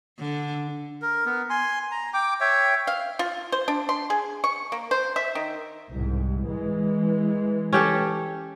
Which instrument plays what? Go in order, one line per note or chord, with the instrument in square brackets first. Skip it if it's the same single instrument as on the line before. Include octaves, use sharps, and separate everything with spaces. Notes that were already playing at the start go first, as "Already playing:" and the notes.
[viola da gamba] D3
[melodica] A#4
B3 A#4
G#5 C6
A#5
G5 D6
C#5 E5 G5
[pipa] F5
F4
C5
D4
C6
G#4
C#6
A#3
C5
E5
D#3
[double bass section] C2 G#2
E3 G#3
[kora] C#4 G4 A4